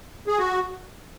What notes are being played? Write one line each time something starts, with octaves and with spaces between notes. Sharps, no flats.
G#4
F#4